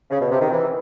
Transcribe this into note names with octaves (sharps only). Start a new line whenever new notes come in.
C#3
B2
C3
D#3
E3